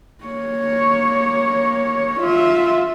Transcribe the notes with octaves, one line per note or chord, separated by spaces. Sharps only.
A#3 C#5
F4 E5